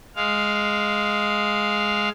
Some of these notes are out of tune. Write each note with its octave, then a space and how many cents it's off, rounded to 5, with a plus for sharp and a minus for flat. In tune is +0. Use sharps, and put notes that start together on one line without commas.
G#3 +5 F5 +0